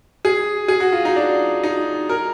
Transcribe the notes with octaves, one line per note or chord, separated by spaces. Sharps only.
G#4
G#4
F#4
F4
D#4
D4
D#4
A#4